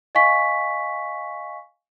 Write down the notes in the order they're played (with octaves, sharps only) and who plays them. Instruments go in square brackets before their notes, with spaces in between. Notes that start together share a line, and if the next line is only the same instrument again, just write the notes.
[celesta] D#5 F5 G#5 C#6 B6